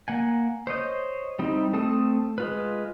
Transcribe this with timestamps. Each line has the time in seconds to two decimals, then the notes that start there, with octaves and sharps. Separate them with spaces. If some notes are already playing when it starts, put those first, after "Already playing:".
0.08 A#3 F#5 G#5
0.67 C5 C#5 D#5 G6
1.39 G3 C4 D#4 E4
1.73 A3 C4 A4 A5 D#6
2.38 G#3 F4 B4